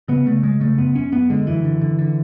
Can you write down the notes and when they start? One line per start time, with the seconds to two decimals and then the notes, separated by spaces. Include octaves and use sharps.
0.08 C#3 B3
0.26 C#3 A3
0.43 C#3 G#3
0.60 C#3 A3
0.78 F#2 B3
0.95 F#2 C#4
1.12 F#2 B3
1.30 D3 G#3
1.46 F#2 E3
1.64 D3
1.81 D3
1.99 D3